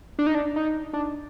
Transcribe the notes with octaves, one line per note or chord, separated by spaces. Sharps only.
D4
D#4
D4
D#4
D4